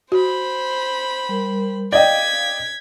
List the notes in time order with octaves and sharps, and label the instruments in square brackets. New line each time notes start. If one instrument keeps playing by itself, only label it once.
[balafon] F#4 [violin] C5 B5
[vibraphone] G3 A#4
[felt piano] D5 D#5 G5 [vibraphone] F5 [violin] G#6 B6